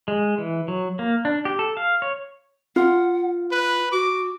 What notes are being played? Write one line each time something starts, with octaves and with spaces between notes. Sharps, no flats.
G#3
E3
F#3
A#3
D4
G4
A4
F5
C#5
F4 F#5
B4 F#6
F#4 D6